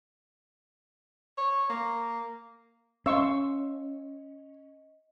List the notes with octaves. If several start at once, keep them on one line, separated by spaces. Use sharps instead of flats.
C#5
A#3
C#4 D#5 F5 C6 C#6 E6